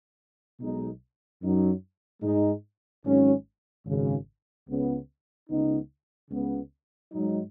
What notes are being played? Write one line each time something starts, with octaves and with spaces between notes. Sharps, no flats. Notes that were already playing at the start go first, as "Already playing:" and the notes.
B1 B2 G#3 D#4
F#2 F#3 D#4
G#2 G#3 D#4
G#1 G#2 F#3 C#4
G#1 F#2 C#3
C#2 C#3 B3
C#2 C#3 B3 D#4
C#2 C#3 B3
G#2 F#3 D#4